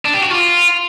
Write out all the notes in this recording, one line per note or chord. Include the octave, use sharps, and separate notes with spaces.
D4
G4
F#4
F4